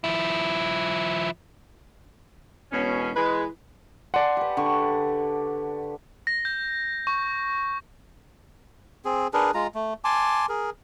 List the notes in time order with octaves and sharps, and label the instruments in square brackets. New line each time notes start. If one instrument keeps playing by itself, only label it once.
[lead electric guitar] F3 E4
[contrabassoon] E1 [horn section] B2 C#4
[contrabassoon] E3 [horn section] G#3 [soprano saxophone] B4
[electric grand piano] D5 F#5 [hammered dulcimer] G#5 A5 C6
[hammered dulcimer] G4 B4
D3 C#6
[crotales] A#6
G6
C#6
[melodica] C4 G#4
D4 G#4 A#4 B4
G#3 F4 A#5
A3
G#5 A5 C6 D6
G#4 A#4